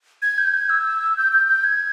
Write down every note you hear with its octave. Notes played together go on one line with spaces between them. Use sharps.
G#6
G6
G#6
E6
G6
G6
G6
G#6